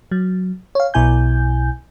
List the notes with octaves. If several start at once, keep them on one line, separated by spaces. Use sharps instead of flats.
F#3
C#5 F5
B1 B2 E4 G#5 G6